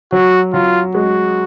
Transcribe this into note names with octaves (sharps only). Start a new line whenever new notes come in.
F#3 F#4
F#3 F4
G#3 F#4